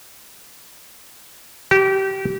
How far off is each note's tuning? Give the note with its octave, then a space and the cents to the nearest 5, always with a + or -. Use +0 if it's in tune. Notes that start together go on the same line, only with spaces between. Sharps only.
G4 -25